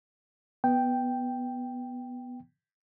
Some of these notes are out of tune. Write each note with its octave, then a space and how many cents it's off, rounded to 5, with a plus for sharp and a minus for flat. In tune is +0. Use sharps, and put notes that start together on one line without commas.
B3 +0 G5 +0